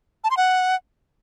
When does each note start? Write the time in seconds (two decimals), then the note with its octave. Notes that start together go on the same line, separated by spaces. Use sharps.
0.24 A5
0.30 C6
0.37 F#5